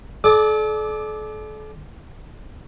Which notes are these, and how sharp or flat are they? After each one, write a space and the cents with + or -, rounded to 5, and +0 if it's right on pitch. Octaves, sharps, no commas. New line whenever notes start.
A4 -40 D5 +10 D6 +30